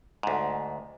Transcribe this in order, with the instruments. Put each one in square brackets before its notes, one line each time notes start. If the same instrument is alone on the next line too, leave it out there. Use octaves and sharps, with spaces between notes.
[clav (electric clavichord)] D2 G#2